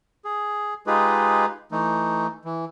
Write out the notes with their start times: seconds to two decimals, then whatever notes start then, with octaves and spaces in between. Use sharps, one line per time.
0.25 G#4
0.87 G#3 D#4 F4 G4 G#4 B4
1.72 E3 A3 D#4
2.45 E3